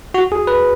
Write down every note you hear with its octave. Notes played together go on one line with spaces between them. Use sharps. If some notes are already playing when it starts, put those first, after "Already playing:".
F#4
G#4
B4